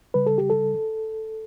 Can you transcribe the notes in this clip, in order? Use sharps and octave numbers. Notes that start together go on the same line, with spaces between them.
C#3 G3 B4
A4
G4
A4